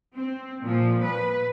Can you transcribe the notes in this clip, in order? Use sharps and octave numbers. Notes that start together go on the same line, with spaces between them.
C4
A#2 F3
B4